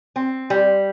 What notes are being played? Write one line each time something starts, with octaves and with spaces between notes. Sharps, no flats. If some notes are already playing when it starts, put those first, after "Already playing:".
C4
G3